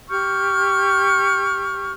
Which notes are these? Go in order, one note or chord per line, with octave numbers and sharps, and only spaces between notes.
G4 C#6 F6 G6